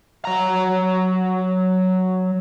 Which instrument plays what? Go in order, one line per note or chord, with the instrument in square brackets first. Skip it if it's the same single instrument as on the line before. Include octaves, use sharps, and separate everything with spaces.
[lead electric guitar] F#3 A#5